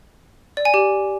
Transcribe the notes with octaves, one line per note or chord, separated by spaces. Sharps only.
D5
G#5
G4